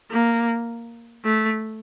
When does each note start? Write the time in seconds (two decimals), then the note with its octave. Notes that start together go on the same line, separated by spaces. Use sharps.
0.11 A#3
1.24 A3